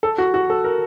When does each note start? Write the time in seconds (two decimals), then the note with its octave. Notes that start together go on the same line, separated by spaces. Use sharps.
0.03 A4
0.18 F#4
0.34 F#4
0.50 A4
0.65 A#4